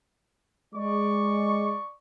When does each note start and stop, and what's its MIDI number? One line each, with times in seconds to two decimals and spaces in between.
0.75 1.73 56
0.75 1.94 74
0.75 1.94 85